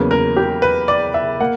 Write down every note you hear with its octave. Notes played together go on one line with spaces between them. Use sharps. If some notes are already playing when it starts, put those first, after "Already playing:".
Already playing: E2 C#3 F#3 A#3 B4
A#4
G4
B4
D5
E5
A#3 F#5